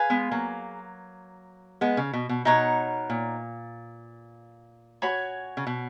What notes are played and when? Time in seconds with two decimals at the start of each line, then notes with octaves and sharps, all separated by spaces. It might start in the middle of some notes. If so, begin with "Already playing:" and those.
Already playing: G#4 B4 F5 G#5
0.10 G#3 B3
0.31 F#3 A#3
1.81 G#3 B3
1.97 C#3
2.13 B2
2.29 B2
2.45 B2 D#4 A#4 C#5 F#5
3.10 A#2
5.02 F#4 C#5 G#5 B5
5.57 C#3
5.67 B2